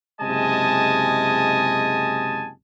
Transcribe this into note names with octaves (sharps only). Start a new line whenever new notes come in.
F#1 C3 G#3 D#5 G#5 A5